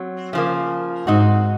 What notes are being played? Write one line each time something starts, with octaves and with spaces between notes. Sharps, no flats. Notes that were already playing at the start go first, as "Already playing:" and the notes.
Already playing: F#3 C4
C#3 F3 A#3
G#2 C4 D#4 F#4